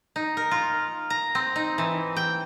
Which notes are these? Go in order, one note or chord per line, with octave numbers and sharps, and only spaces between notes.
D#4
A#4
F4
A#5
C4
D#4
E3
G5